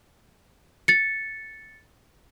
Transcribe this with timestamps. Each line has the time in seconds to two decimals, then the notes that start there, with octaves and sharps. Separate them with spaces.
0.88 A6 C#7